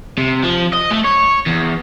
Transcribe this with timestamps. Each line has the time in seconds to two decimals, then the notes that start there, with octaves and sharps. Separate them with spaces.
0.18 C3
0.43 F3
0.73 D#5
0.91 A3
1.04 C#5
1.46 E2